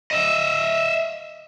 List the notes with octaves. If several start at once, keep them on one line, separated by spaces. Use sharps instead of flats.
D#5 E5